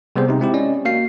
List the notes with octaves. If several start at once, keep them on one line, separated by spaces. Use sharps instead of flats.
C3 G3 B3 G#4 C5
C3 D#4
G#3 C4 E4 G4
C#4 D5 D#5
A#3 F#4 F5 C7